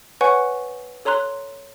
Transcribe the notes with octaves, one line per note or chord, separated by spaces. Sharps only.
B4 C#5 F#5 G#5 C#6
A4 C#5 A#5 C6 F#6